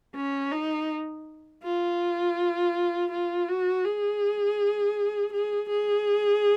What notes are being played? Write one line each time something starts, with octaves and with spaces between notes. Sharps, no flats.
C#4
D#4
F4
F4
F#4
G#4
G#4
G#4